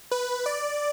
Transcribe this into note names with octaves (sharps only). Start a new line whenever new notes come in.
B4
D5